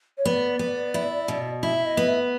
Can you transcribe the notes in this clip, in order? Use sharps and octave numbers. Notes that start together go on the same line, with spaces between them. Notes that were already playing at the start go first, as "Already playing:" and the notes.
C#5
B3 D5
B3
E4
B2
E4 E5
D#5
B3
E5